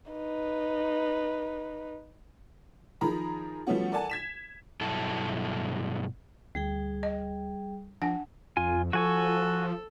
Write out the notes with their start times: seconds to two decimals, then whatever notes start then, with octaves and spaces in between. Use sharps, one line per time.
0.12 D#4 B4
3.01 D#3 F3 G#4 A#4 A#5 B5
3.67 F3 G3 A3 B3 C#4 F#4
3.91 A4 A#4 D5 F#5 G#5 A5
4.10 G#6 B6 E7
4.81 G2 B2 F#3 E4 A4 A5
6.55 D2 G3 G#4 G5
7.03 D#5
8.02 F3 D4 F#5 G#5
8.57 F2 F4 G#5
8.93 F3 F#4 A4 G#5 C#6